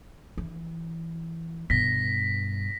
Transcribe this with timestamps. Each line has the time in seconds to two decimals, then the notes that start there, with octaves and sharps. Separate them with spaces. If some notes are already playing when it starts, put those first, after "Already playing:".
0.37 E3
1.70 G2 B2 A#6 B6